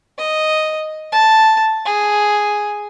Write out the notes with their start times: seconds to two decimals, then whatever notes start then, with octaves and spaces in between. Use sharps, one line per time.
0.18 D#5
1.12 A5
1.85 G#4